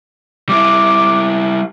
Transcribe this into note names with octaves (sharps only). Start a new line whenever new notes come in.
G3 E4 D6